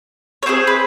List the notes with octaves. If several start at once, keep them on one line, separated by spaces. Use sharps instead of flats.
C#5
C4 E4 G#4 C5
B4